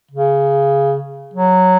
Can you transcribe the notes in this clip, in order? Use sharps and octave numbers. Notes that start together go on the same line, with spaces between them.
C#3
F#3